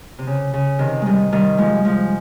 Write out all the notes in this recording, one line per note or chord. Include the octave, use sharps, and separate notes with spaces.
C3
C#3
C#3
C3 D#3
D#3 G3 G#3
D#3 G3
F3 G#3
F3 G#3